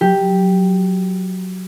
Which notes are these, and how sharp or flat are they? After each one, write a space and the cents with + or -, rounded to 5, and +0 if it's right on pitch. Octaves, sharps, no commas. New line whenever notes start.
F#3 +0 G4 +0